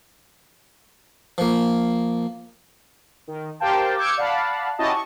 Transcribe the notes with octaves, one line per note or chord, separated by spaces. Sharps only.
F3 A#3
D#3
G4 A#4 C5 F5 G5 A5
D6 E6 F6 G6 G#6 C#7
D5 F5 F#5 A5 B5
C#4 E4 F#4 G4 D#5 A5
C#6